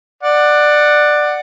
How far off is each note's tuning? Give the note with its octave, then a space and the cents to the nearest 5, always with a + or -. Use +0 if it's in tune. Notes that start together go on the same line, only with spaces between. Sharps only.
D5 +15 F#5 +0